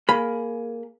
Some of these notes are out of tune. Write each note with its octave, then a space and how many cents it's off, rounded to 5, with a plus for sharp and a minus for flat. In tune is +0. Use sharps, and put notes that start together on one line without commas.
A#3 +0 G#4 +15 B5 +0